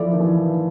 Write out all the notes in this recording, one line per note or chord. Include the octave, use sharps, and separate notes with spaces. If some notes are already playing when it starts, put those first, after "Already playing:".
Already playing: F3 E4 A4 D5
D#3
E3